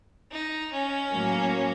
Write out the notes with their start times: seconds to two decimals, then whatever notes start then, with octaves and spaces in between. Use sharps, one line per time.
0.31 D#4
0.72 C#4
1.12 A2 F#3 A#3